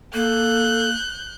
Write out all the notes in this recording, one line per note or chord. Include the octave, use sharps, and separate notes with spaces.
A#3 A4 F#6 G6